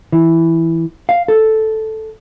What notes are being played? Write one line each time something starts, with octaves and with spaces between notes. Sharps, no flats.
E3
F5
A4